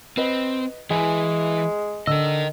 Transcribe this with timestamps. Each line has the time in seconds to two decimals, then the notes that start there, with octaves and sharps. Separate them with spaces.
0.17 C4 B4 D#5
0.91 E3 G#3 E4 D#5 G#5
2.07 D3 A#4 D#5 E6